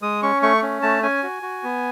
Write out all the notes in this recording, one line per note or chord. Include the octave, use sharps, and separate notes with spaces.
G#3 D#6
C#4 C#6
A3 C#6
C#4
A3 A5
C#4 G#5
F#4
F#4
B3